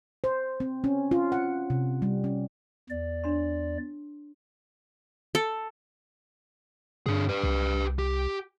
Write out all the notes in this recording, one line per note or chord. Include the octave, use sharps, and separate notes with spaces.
C5
C4
C#4
F4
F#5
C3
G3
C#4
E2 D5
D4 C#5 C6
A4
G2 D3 G#4
G4 B4
C2
G4